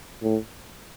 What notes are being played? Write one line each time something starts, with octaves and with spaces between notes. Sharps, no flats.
A2